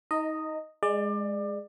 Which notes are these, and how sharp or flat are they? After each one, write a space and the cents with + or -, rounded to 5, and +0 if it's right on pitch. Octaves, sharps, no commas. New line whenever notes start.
D#4 +25 D#5 +0 A#5 -30
G#3 -5 D5 +25